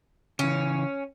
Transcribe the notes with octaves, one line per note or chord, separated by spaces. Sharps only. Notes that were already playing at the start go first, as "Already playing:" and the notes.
C#3 E3 C#4